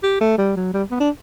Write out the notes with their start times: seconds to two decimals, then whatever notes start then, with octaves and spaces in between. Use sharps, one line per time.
0.03 G4
0.21 A3
0.38 G3
0.56 F#3
0.73 G3
0.91 B3
1.00 D4